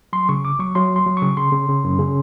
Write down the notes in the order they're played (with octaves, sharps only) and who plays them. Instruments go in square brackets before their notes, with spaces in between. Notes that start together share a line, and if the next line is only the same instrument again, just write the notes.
[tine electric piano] F#3 C6
C#3 C#6
G1 D6
F#3 C#6
F#3 C6
G1
C6
F#3
C#6
C#3
C#3 C6
C#3
C#3
F#2
C#3